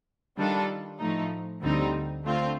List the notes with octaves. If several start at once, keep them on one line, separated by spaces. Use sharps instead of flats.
D#3 G3 D4 F4 A4
A2 F3 A3 D#4
D2 D3 G3 C4 D#4
D3 A3 C4 F4